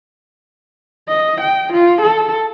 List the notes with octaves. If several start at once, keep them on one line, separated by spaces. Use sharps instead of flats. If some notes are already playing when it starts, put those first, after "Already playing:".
D#5
G5
F4
A4